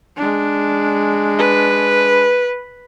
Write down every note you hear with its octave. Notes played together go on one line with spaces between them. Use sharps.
G#3 D4
B4